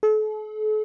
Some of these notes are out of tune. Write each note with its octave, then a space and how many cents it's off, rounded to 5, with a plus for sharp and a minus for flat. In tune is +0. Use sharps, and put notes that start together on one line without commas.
A4 -40